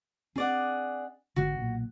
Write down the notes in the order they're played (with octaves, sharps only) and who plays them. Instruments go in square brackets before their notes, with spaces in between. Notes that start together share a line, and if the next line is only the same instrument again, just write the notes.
[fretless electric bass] C4 D4 [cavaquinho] G#4 D5 F#5
[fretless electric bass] G#1 D3 G#3 [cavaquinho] F#4
[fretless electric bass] B1 A#2